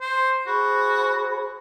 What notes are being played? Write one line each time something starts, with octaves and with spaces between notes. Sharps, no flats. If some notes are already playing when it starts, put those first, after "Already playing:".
C5
F#4 G#4 C5 B5